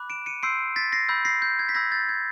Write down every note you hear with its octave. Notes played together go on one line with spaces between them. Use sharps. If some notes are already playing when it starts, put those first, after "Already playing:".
Already playing: B5 D6 F#6
D7 E7
C#7 D#7
C6 E6 G6 C7 D7
A6 B6
A#6 C7
B5 E6 G6
A#6 C7
G6
G#6
B6
B5 E6 G6 G#6 A#6
G6 A6
G#6